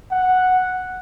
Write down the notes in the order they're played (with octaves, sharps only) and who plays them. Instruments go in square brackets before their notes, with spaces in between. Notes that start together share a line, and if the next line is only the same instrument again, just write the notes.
[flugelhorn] F#5